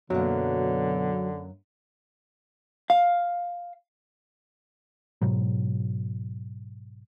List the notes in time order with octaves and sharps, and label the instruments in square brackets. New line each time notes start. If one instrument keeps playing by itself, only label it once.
[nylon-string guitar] F#2 A#3 [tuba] B2 [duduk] D3 [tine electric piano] F#3
[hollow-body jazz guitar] F5
[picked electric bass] G#2 B2 F#3